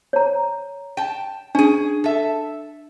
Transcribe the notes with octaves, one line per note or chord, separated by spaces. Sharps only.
C#5 A#5
G5 A5
C#4 D4 G#4
A4 E5